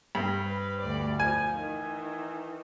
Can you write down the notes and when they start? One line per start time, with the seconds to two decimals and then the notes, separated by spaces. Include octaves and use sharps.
0.15 G2
0.45 B4
0.81 D2 D5
1.20 F3 G#5
1.58 D#3 E3